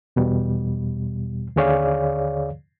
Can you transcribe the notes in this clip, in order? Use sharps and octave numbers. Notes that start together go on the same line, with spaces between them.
E2 B2 G3
D#2 D3 G#4 C#5 D5 F5